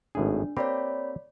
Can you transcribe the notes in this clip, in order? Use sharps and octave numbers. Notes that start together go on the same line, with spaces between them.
G#1 A2 D4 G#4
A#3 C4 G4 C#5 D5 B5